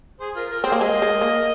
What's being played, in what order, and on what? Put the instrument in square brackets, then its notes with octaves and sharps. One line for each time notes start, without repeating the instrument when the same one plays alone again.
[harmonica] G#4 C5
F4 A#4
F4 A#4
[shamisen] C4 [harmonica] G#4 C5
[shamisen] A#3
[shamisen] G#3 [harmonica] A#4 D#5
[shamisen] G#3
A#3